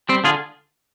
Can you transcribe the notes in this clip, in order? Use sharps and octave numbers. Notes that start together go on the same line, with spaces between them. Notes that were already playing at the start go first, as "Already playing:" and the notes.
G3 C4
D3 F4 G#4